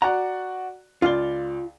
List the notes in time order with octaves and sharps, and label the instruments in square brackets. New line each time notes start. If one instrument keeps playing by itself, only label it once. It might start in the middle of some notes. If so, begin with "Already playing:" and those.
[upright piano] F#4 D5 F#5 [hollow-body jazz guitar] A#5
[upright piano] C#2 D5 G7 [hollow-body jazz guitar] F4 F5